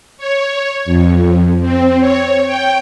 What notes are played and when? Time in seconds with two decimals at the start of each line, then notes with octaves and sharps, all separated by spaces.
0.17 C#5
0.85 F2
1.61 C4
1.99 C#5
2.45 G5